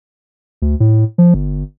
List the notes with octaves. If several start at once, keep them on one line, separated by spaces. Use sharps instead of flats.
D2
A2
F3
G1